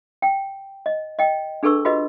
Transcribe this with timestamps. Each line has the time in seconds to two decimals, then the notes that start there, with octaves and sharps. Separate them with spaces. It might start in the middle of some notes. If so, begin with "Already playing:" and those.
0.22 G5
0.86 D#5
1.19 D#5 G5
1.63 D4 G#4 A4 B4 C#6 E6
1.85 F4 F#4 G#4 B4 D#5